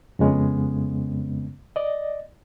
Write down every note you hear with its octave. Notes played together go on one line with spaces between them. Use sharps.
F2 C#3 G#3 B3 C#4
D5 D#5